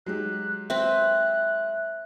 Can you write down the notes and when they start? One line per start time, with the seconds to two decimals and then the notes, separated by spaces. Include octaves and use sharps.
0.06 F#3 G#3 G4 F#6
0.70 C4 B4 E5 F#6